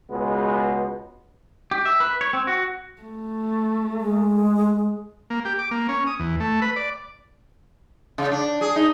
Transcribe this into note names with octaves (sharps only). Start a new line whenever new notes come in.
C#2 B2 G#3 B3
G4
E5
B4
C#5
C4
F#4
A3
G#3
A#3
G4
D6
A#3
C#4
D#6
E2
A3
B4
D5
C#3
D4
G#4
D#4